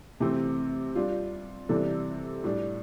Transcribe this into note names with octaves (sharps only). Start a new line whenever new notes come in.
C3 E3 A3 C4
G3 D4 F4
C3 E3 G3 D4 A4
A2 G3 D4